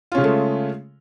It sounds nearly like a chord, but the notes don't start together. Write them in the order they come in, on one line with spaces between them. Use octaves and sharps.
F4 C#4 C#3 G#3 A3